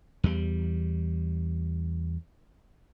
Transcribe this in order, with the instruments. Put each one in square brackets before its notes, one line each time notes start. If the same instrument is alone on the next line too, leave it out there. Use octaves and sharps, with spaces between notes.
[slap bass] E2 G3